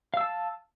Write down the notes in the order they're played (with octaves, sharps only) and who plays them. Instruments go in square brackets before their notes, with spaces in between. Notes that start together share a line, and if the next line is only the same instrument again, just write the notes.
[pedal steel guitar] F5
E6
A5